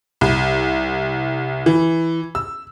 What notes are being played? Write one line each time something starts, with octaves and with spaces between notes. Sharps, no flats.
C2
E3
E6